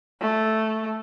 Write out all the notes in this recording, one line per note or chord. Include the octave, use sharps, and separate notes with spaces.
A3